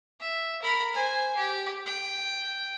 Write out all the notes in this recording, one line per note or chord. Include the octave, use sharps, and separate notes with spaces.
E5
A#4 B5
C5 G#5
G4
G5